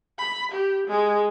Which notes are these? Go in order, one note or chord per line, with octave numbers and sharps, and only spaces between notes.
B5
G4
G#3